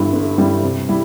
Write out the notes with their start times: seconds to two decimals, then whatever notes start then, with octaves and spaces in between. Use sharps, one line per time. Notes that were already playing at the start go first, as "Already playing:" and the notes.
Already playing: G1 G2 G3 E4
0.13 G1
0.38 G2 G3 E4
0.63 C3
0.89 G3 E4